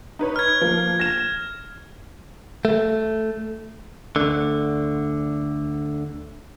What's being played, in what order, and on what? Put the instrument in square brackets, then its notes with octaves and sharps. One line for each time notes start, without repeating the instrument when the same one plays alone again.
[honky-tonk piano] D#4 B4 C#5
[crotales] F6 G#6
[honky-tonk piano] F3 A#3
A#6 E7
[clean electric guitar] A3
D2 D3